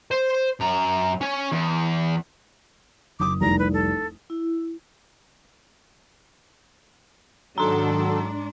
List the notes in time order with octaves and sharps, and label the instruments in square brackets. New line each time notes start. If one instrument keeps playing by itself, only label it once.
[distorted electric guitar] C5
F#2 A#5
C#4 C#5
E2
[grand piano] F#1 D#6 [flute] D6
[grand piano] F1 C2 [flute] A#5
[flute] B4
A4
[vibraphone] E4
[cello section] G#2 D4 [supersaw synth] D#3 A4 [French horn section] F#3 [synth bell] A#5 C6